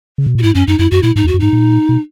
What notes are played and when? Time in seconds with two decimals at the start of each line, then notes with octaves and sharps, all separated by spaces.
0.18 C#3
0.26 B2
0.35 A#2
0.39 F#4
0.42 G#2 E4
0.55 F#2 C#4
0.68 F#2 D#4
0.79 F#2 E4
0.91 F#2 F#4
1.03 A#2 E4
1.16 G#2 D#4
1.24 E2
1.28 F#4
1.34 F#2
1.40 G#2 D#4
1.53 A#2
1.89 B2